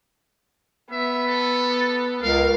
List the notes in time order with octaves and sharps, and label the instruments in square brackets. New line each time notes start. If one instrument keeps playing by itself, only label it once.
[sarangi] B3 [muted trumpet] E5
[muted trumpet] A4
[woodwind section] C#2 [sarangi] A#4 [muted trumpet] F5